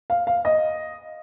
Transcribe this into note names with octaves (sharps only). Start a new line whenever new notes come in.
F5
F5
D#5